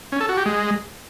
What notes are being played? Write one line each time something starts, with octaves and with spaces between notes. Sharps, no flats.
C#4
A4
F#4
G4
G#3